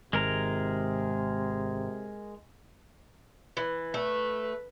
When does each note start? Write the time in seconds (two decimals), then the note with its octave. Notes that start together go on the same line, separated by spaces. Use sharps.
0.13 G#1 C3 G#3 A#4 A#5
3.57 E3
3.94 A3 B4